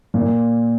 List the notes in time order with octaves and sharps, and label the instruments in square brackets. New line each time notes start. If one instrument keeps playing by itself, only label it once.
[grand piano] A#2